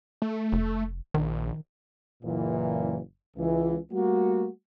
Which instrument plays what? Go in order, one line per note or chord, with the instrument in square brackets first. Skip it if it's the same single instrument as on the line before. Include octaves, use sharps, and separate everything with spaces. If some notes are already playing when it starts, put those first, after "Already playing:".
[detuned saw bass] A3
[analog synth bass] F1
[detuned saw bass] A#1 [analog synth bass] D#3
[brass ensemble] F#1 A#2 E3
C#2 E3
G3 A3 A#3 F#4